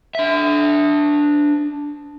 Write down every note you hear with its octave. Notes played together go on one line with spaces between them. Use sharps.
D4 E5